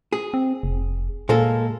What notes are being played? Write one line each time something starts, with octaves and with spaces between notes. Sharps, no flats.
G#4
C4
F1
A#2 G#3 A#3 A4